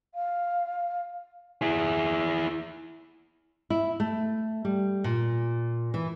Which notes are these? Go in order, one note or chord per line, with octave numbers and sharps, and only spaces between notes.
F5
E4 G#4
E4
A3
G3
A#2
E3